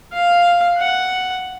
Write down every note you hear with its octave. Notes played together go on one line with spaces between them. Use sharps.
F5
F#5